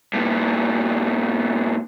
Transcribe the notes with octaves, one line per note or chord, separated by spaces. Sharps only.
G2 A#2